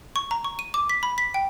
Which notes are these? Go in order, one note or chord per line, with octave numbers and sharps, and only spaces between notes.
C#6
A#5
C#6
D#7
D6
B6
B5
B6
G5